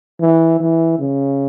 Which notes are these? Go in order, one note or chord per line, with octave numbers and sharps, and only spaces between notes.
E3
E3
C#3